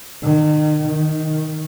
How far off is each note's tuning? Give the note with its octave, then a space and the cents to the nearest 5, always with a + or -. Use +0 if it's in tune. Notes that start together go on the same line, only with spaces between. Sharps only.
D#3 -35
D#3 +5